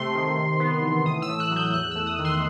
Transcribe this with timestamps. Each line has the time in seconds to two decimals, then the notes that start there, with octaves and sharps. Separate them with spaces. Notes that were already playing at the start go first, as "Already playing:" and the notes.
Already playing: C3 A3 C6
0.15 D#3
0.37 C3
0.60 B3
0.83 E3
1.05 A2 D#6
1.22 E6
1.29 A3
1.40 F#6
1.51 F#3 G6
1.73 E2 F#6
1.91 A3 E6
2.07 D#6
2.19 D#3
2.25 C6